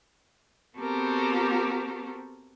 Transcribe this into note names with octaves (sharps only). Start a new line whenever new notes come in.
B3 C4 F#4 G4 A4 A#4